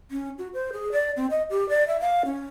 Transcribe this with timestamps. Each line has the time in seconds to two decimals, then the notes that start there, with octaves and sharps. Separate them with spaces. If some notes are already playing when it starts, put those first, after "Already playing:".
0.11 C#4
0.38 F#4
0.54 C5
0.73 G#4
0.92 D5
1.16 C4
1.30 D#5
1.50 G4
1.69 D5
1.88 E5
2.00 F5
2.25 C#4